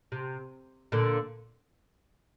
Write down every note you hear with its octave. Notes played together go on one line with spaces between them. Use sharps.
C3
A#2 D3